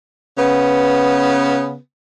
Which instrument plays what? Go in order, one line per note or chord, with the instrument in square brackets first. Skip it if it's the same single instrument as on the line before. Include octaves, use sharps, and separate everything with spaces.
[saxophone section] C#3 B3